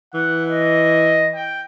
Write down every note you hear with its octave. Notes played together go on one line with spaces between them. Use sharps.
E3 F#5
D#5
G5